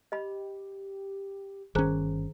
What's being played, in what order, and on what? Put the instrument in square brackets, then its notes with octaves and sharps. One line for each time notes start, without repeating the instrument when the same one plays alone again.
[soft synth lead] G4 [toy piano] D#5 B5
[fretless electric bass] G1 C#4 [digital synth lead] D#3 [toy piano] G#4 C5 A#5